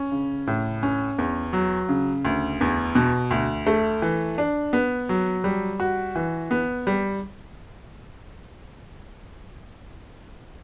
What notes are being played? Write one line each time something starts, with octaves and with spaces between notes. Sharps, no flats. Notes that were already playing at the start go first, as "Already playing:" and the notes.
Already playing: C#4
C#3
A2
C#4
E2
F#3
C#3
D2
E2
B2
D2
A3
E3
D4
B3
F#3
G3
F#4
E3
B3
G3